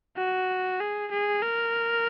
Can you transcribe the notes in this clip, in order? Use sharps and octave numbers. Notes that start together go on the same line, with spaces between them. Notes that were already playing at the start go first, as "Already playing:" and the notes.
F#4
G#4
G#4
A#4